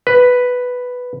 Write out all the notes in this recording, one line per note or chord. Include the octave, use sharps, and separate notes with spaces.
B4